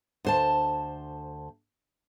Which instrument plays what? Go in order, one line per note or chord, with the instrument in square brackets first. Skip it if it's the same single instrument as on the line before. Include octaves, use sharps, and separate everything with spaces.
[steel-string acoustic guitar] D2 C5 A5